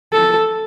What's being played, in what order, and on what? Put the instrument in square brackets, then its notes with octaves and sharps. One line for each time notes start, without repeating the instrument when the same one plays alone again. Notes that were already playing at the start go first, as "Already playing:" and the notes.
[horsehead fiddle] A4